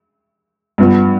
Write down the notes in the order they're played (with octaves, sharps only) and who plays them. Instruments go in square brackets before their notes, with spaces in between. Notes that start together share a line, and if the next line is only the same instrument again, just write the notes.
[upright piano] G2 F3 B3